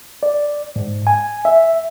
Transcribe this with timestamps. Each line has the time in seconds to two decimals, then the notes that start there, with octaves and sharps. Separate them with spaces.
0.23 D5
0.76 G#2
1.07 G#5
1.45 E5